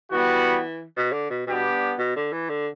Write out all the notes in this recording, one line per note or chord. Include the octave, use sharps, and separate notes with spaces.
E3 G3 B3 F#4
B2
D3
B2
B2 G3 B3 D4 G4
B2
D3
E3
D3